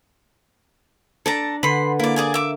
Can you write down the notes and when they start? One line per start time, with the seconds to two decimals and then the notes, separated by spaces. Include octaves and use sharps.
1.26 D4 A4 D5 A5 A#5
1.63 D3 B4 F#5 B5 C6
2.00 A#3 E4 D5
2.16 G#4 D5 G#5
2.34 E5 D6